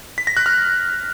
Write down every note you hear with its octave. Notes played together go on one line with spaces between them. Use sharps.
B6
A#6
F#6
F6